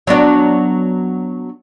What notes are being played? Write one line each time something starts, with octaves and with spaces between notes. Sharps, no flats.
F#3 B3 D4